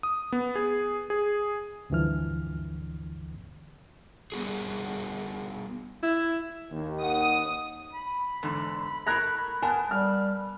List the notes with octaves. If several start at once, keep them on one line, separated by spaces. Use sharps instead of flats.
D#6
B3
G#4
G#4
D2 G2 D3 E3 F3 F6
G3 B3 F#4 G#4
E4
D#2 D#3
F#5 D#6
B5
E2 G#2 D3
A2 A#4 A#5 F#6 G#6 A#6
B3 A#4 G#5 A5
G3 F6